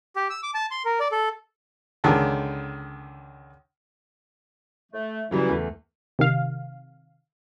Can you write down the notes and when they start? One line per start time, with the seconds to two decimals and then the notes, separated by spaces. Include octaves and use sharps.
0.16 G4
0.30 E6
0.43 D6
0.54 A5
0.71 C6
0.85 A#4
1.00 D5
1.12 A4
2.04 C#2 D3 D#3 A5
4.92 A3
5.31 C#3 E3 F#3 G3 E4
5.49 E2 A3
6.19 C3 D#3 F5